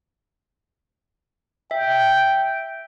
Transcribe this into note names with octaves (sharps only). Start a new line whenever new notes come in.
E5 G5